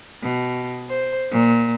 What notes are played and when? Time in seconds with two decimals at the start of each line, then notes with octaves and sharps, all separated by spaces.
0.22 B2
0.90 C5
1.32 A#2